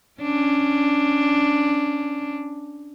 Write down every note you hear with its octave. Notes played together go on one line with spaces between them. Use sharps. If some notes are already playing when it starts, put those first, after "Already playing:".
C#4 D4